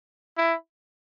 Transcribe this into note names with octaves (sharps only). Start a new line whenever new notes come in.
E4